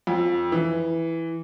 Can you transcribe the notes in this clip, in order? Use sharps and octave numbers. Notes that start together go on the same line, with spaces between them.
F2
E3